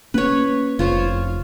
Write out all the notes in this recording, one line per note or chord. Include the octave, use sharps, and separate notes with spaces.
A#3 C#4 B4 C#5
F1 F4 C5 C#5